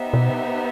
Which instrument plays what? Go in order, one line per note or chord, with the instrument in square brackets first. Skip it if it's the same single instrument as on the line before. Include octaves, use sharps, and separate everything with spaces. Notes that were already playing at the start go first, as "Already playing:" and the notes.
Already playing: [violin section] B3 D#4 G4 C5 E5
[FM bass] B2